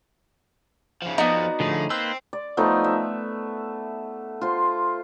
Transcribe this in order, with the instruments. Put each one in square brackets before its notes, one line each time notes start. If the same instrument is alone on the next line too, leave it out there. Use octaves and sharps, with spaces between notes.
[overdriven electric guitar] C#3 F3
[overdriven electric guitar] F2 F3 [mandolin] B3 F#4 D5 [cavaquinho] D#4
[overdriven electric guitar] A2 [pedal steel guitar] D3 F3 G#4
[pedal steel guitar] A#3 B4 C5 [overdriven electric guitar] C4 [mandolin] E6
[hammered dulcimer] D5
F3 A3 B3 D#4
E5
F4 C5